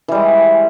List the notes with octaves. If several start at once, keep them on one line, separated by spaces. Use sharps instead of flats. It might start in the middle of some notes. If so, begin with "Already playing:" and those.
E3 G3 G#3